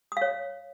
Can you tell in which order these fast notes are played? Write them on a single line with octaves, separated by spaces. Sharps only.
D#6 F5 C#5